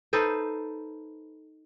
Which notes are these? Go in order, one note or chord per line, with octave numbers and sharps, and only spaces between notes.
D#4 A4 B4 C5